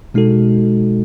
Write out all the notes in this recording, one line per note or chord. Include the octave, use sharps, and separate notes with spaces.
B2 G#3 D#4 F#4 A4